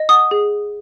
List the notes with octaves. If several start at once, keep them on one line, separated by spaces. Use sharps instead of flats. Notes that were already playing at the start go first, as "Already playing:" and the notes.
Already playing: D#5
F#5 D#6
G#4